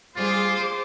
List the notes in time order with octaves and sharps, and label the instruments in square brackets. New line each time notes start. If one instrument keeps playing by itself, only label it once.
[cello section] G3 G#4 [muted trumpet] F4 [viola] C5 D6